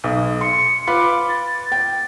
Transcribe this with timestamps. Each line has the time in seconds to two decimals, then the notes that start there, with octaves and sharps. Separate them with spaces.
0.04 B1 D#6
0.41 C6 C#7
0.87 F4 B4 B5 D6
1.29 A6
1.72 G5